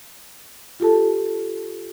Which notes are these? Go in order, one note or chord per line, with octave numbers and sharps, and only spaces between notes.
F4 G4 A4 A5